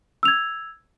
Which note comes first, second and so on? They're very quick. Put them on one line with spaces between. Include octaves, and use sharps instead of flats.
E6 F7 G#6